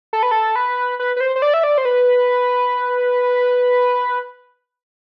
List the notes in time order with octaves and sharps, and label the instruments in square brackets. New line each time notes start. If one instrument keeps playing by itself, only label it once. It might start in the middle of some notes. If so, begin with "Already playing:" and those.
[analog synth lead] A4
B4
A4
B4
B4
B4
C5
C5
D5
E5
D5
C5
B4